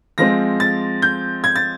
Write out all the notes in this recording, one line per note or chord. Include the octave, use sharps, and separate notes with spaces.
F3 G#3 C4 A#6
A6
G6
G#6
A6